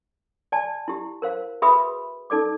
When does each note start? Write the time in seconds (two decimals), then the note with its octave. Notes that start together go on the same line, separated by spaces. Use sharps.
0.52 D5 G#5 A5
0.88 E4 G4
1.22 A#4 C5 F5
1.62 F#4 G#4 B4 E5 B5 D#6
2.30 D#4 A4 D5 D6